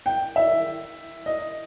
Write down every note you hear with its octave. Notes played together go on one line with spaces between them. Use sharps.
G5
E5
D#5